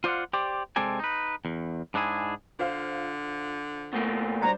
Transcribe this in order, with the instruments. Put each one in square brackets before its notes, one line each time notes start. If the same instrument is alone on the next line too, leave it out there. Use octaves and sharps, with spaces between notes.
[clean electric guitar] F4 C5 D5 D#5 F5 F#5
G4 C5 D5
C3 G#3 C4 A4 D5 G#5
D#4 B4
E2
G#2 D4 E4 G#4
[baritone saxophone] D3 [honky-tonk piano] F4 C5 F5
[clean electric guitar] B2 A3 A#3
[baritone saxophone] F#3 [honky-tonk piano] G3 D4 C5 [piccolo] A#5